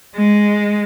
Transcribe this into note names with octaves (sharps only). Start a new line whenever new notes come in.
G#3